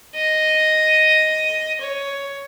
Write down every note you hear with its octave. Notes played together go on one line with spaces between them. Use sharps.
D#5
C#5